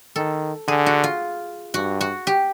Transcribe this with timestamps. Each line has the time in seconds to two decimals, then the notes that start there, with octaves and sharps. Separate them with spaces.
0.16 D#3 A4
0.68 D3 G#4
0.86 F#4
1.04 F4
1.74 G2 F#4
2.01 F#4
2.27 G4